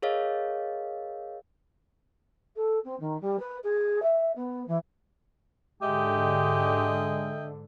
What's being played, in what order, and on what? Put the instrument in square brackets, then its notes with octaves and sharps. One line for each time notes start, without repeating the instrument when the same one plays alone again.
[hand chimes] G#4 A#4 C#5 D#5 F5
[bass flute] A4
C4
D#3
G3
B4
G#4
E5
B3
E3
[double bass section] G#2 D3 [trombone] G#3 [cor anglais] G4 [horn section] D#5 E5 G5